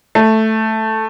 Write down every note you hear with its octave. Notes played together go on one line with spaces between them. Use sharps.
A3